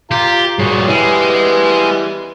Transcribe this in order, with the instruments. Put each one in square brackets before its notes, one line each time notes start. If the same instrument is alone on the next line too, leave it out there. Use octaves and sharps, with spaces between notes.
[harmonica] F4 A#5 [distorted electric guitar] G4
[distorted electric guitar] G2 A#2 [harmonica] F#4 G#4 C#5
[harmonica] E3 G3 B3 [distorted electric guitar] G#3